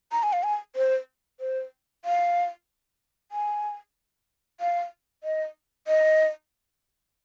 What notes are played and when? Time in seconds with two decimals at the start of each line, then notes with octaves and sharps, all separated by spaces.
0.12 A#5
0.23 G#5
0.33 F5
0.43 G#5
0.76 C5
1.40 C5
2.05 F5
3.32 G#5
4.60 F5
5.24 D#5
5.87 D#5